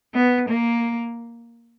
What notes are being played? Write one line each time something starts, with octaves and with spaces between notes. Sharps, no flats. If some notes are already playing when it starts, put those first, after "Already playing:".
B3
A#3